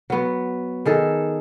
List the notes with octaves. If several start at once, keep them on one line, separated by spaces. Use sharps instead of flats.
F#3 B3
D#3 G#4 A4